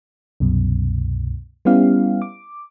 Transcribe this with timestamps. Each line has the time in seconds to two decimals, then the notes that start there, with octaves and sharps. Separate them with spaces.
0.40 C2 F#2 B2
1.65 G3 B3 C#4 E4 G4 F5
2.22 D6